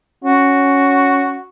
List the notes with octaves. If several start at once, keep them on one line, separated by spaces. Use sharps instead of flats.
C#4 F#4